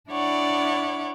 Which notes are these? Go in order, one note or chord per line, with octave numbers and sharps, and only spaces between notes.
D4 E4 C#5 D5 F#5